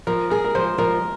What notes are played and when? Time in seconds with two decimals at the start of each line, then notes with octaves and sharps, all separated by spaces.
0.07 F3 A#4
0.30 G#4 A#4
0.44 A#4
0.55 F3 C5
0.78 F3 A#4